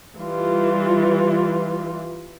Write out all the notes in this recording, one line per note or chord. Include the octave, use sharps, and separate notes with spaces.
E3 G3 F4